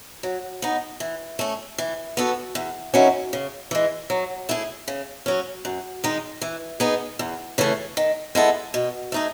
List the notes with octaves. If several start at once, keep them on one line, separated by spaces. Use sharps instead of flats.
F#3
B3 D#4
E3
A3 C#4
E3
B3 F#4 A4
E2
D#3 F#3 C#4 E4
C#3
E3 G#3
F#3
A3 E4 G#4
C#3
F#3 C#4
F#2
D#3 G#3 D#4
E3
B3 D#4 G#4
E2
C#3 E3 A3
D#3
G#3 B3 E4 A4
B2
A3 D#4 G#4